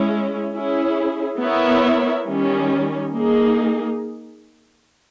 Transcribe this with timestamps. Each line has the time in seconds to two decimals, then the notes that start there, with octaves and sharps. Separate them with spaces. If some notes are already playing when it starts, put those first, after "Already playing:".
Already playing: G#3 C#4 E4
0.54 C#4 E4 G#4
1.40 B3 E4 A#4 C#5 E5
2.27 D#3 G3 C#4
3.12 A#3 D#4 G#4